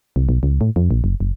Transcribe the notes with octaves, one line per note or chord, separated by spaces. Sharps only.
C2
B1
C#2
A2
F2
A#1
F#1
F#1